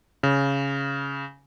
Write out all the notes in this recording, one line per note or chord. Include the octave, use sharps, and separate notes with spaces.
C#3